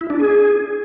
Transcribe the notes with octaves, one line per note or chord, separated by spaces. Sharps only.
E4
D4
G#4